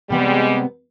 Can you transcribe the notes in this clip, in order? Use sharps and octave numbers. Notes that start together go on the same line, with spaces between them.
C3 G3 G#3 B3 C4